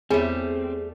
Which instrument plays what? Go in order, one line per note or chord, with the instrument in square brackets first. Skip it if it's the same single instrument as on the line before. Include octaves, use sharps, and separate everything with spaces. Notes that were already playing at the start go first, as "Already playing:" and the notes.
[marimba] E2 B3 C#5 [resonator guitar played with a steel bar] G3 A3 [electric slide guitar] C4 [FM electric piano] G#4